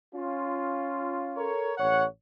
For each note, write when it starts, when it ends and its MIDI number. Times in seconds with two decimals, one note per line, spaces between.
0.14 1.50 61
0.14 1.50 65
1.36 1.74 69
1.36 1.74 70
1.36 1.74 73
1.78 2.05 33
1.78 2.05 73
1.78 2.05 78